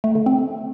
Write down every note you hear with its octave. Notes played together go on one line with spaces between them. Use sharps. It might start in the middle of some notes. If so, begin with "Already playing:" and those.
A3
D3
C4